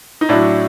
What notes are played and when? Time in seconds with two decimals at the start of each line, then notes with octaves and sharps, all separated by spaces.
0.21 D#4
0.29 A2 F#3 D4 E4